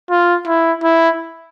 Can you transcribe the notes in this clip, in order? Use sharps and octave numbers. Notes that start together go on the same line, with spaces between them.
F4
E4
E4